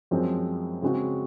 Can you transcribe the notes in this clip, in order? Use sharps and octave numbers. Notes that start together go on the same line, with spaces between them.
F#2 F3 G#3 C4
C#3 G#3 C4 F#4